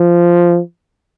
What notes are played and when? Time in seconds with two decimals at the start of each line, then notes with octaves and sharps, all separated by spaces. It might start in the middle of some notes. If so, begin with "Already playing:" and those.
Already playing: F3